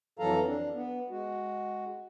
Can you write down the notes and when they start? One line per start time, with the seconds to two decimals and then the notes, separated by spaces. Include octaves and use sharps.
0.19 F2 E3 F#3 A4 F5 A#5
0.45 D4
0.74 B3
1.10 G#3 F#4